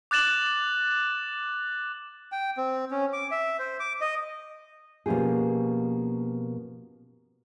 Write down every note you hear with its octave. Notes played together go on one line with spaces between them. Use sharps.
D6 F#6 A6 E7 F#7
G5
C4
C#4
D6
E5
C5
D6
D#5
B2 F3 A#3 C#4 G4 G#4